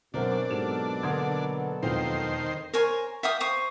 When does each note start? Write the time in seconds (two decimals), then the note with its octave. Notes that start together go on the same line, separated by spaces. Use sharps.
0.14 F#2 B2 C4 D4 A#4
0.49 G#2 B2 F#3 G4 A4 E7
1.03 D3 A#3 B3 C6 D#6 G#6
1.83 E1 F2 D#3 C5 F5 G5
2.73 A#4 C5 C#5 G#5
3.23 E5 F5 G5 D#6
3.40 C5 C#6 D#6